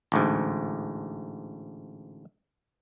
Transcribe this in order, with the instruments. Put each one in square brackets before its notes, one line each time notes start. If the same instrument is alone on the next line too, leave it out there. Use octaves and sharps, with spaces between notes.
[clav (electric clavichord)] A1 D2 G#2